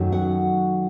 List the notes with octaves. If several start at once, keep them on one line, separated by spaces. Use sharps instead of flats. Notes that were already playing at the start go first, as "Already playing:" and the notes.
Already playing: F#2 D#3 F#3 A3
F#5